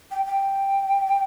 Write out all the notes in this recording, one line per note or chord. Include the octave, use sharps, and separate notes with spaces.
G5
G5